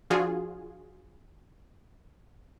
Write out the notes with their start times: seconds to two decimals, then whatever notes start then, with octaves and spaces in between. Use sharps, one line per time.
0.10 F3 D4 F4 F#4 G#4